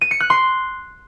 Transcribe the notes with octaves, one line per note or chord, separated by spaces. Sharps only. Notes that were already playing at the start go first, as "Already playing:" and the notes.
D#7
C#7
F#6
C6